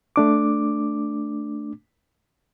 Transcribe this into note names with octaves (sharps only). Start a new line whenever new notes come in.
A3 D4 D6